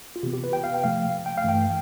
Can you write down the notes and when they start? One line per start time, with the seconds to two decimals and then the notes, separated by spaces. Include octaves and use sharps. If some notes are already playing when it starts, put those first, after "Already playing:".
0.16 F4
0.23 C3 E3 B3 G4
0.33 G4
0.44 B4
0.53 G5
0.64 F5
0.74 G5
0.84 C3 F3 A3 F5
1.26 G5
1.38 F5
1.44 G2 E3 A3 G5